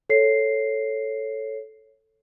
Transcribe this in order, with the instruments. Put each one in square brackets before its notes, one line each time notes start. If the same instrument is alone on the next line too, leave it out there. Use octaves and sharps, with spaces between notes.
[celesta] A4 C#5 C7